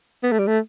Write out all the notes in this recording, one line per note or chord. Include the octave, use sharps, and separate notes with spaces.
B3
A3
G3
A3